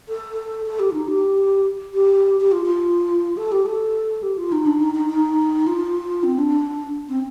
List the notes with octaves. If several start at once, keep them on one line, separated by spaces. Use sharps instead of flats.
A4
A4
G4
F4
D#4
G4
G4
G4
F4
F4
A4
G4
A4
G4
F4
D#4
D4
D#4
D#4
D#4
F4
C4
D4
C4